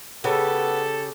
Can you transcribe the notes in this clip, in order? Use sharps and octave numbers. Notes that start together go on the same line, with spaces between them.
C#3 B3 G4 A4